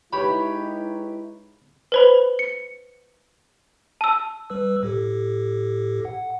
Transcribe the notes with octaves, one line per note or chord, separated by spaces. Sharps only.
G#3 D#4 E4 G4 B4 C#5 B5
B4 C5 B5
C#7
A5 E6
G3 B4 E6
A2 G4 A4
F#5